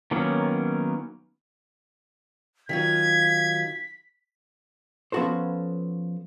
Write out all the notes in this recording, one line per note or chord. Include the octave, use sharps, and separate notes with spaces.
D#3 F#3 A#3 B3 C#4
D#3 F#3 F4 G#6 B6
F3 B3 C#4 F#4 A4 C5